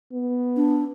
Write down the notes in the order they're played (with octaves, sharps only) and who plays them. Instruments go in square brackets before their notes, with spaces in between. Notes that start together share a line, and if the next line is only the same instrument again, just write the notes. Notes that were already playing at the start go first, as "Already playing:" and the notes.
[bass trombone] B3
[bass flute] D4